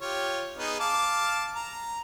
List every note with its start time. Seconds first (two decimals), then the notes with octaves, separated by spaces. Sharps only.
0.01 F4 G4 C#5
0.58 B3 D#4 G#4
0.80 F5 A5 D6
1.55 A#5